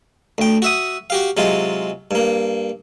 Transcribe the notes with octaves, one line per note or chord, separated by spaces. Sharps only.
D2 G5
F#4 E5 D#6
F#4 G4 F5
C3 F#3 G#3 F4
G2 A#3